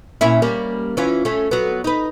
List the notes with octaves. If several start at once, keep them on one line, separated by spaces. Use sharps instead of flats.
A#2 C#4 E4
G3 A#3 C#4
E3 C#4 F4
A3 C#4
F#3 B3
D#4 B4